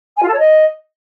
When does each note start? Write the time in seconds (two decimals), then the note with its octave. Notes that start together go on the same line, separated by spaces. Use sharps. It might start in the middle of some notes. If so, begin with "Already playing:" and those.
0.16 G#5
0.22 F4
0.28 A4
0.33 C#5
0.39 D#5